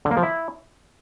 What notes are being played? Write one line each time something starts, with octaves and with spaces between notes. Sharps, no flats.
D3
A#3
F3
E4